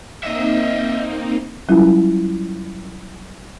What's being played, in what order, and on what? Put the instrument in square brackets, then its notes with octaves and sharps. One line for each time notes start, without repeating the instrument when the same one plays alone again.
[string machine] A#3 C4 D#4 [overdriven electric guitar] D#5 E5
[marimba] F#3 G3 C#4 E4 F4